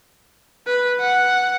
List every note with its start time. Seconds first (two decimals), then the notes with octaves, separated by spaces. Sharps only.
0.67 B4
1.00 F#5